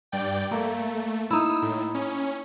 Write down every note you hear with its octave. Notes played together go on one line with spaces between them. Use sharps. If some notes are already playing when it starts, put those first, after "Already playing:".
G2 D5 G5
A3 A#3
D#4 E4 E6
A2
C#4